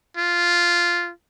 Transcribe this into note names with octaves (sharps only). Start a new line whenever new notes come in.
F4